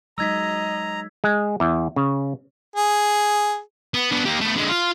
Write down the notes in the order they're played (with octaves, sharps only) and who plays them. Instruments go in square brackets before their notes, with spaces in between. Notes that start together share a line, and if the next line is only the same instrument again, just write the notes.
[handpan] F#3 G#3 D#4 [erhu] D#5 [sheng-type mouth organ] A#5 [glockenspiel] E6 G#6 B6
[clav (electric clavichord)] G#3
E2
C#3
[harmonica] G#4
[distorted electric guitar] B3
B3 D4
A#3 G4
A3 B3
D3 G#3
F4